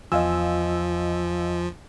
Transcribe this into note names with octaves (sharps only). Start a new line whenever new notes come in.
E2 F3 F4 D#5 F5 G#5 E6